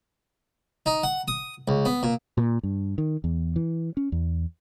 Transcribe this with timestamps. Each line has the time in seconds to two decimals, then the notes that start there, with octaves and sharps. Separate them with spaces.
0.86 D#4
1.03 F#5
1.28 D#6
1.68 C#2
1.85 B3
2.03 A#2
2.37 A#2
2.63 G2
2.98 D#3
3.24 E2
3.56 E3
3.97 C#4
4.12 E2